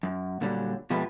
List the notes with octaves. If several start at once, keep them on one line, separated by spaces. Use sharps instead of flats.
F#2
A#2 D3 F#3 G3
B2 F3 G#3 A3 G4 B4